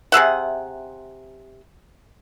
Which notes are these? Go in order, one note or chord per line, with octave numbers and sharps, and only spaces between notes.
C3 G#4 E5 F#5